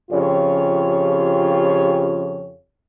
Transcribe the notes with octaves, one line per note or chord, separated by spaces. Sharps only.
F2 C#3 F4 G4 C#5